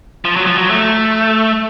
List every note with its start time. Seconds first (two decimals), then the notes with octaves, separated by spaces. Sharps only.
0.25 F3
0.36 F#3
0.47 F3
0.58 F#3
0.70 A3